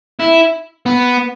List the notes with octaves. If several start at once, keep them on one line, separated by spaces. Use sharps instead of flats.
E4
B3